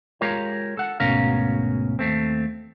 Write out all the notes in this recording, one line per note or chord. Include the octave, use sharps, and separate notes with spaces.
G#3 F4 G4 A#4 C#5
A4 F#5
D2 G#2 B2 C#4 A#4 F5
D#2 A3 C4